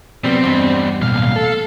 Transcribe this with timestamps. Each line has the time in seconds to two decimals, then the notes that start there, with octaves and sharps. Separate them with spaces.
0.24 C3 F#3 G3 B3 C4
0.44 E2 G2 B2 G3
1.02 B1 A2 F5
1.36 A4